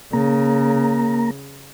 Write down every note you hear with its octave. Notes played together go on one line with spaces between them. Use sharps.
C#3 A#3 A#5